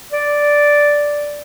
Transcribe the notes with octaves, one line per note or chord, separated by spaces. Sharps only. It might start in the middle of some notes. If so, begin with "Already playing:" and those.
D5